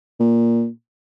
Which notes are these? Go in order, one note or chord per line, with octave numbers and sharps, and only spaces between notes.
A#2